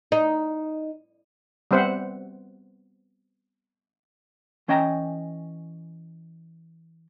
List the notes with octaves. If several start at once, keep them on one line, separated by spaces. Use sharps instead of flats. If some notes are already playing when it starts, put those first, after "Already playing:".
D#4
G3 B3 C4 C5 E5 F#5
E3 C#4 D#5 G5 A#5